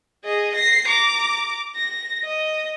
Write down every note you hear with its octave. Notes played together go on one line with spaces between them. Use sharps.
G#4 D#5
A#6 C7
A#5 D6
A#6
D#5